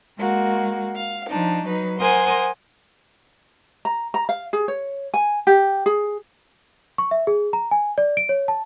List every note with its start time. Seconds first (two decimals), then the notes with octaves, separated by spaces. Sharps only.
0.17 G#3 A#3 F#4
0.95 F5
1.29 F3 D4 D#4
1.65 F#3 D#4 B4
1.99 A#4 C5 F#5 G#5 C6 D#6
3.85 A#5
4.14 A#5
4.29 F5
4.53 G#4
4.68 C#5
5.14 G#5
5.47 G4
5.86 G#4
6.98 C#6
7.11 E5
7.27 G#4
7.53 A#5
7.71 G#5
7.98 D5
8.17 D7
8.29 C#5
8.48 A5